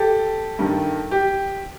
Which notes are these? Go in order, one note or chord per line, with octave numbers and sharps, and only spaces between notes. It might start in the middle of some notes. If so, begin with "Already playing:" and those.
Already playing: G4 A4
G2 D#3
G4